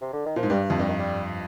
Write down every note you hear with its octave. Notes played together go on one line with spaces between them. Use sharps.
C3
D3
D#3
A#2 F3
G#2
G2 G3
F2
G2 G3
D#3
G3